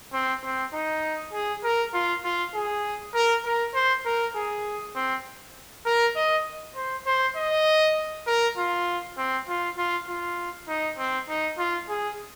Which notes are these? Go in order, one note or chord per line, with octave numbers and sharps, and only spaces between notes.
C4
C4
D#4
G#4
A#4
F4
F4
G#4
A#4
A#4
C5
A#4
G#4
C4
A#4
D#5
C5
C5
D#5
A#4
F4
C4
F4
F4
F4
D#4
C4
D#4
F4
G#4